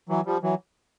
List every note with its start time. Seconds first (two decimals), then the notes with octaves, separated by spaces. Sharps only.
0.09 E3 F#3
0.26 F3 G3
0.43 E3 F#3